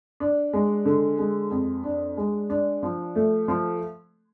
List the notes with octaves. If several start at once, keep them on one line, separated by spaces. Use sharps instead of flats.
D4
G#3
D3
G#3
F2
D4
G#3
D4
F3
A3
F3